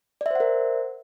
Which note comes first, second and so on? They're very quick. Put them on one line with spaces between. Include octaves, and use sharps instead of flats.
D5 E5 C5 F#5 A#4